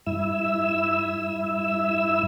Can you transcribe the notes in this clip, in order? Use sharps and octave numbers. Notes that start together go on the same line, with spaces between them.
G2 E4 E6